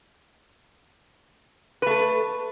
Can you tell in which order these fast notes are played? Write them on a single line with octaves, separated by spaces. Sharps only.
B4 A3 A4